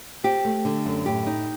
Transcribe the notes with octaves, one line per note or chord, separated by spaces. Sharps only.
C4 G4
A3
D3
F#2
A2 G4
D#4